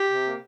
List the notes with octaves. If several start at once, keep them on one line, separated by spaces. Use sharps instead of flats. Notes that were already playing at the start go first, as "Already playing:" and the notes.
Already playing: G4
C3
A#3